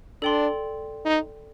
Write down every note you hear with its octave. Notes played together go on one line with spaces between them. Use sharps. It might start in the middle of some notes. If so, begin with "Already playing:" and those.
D4 A4 D5 G5 C6
D#4